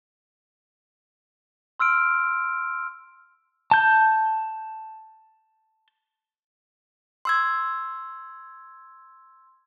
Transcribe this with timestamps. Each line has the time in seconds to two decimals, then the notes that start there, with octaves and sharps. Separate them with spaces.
1.79 C6 E6 F6 D7
3.71 A5 G6
7.25 C6 E6 G#6